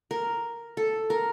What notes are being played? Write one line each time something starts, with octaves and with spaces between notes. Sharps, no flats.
A#4
A4
A#4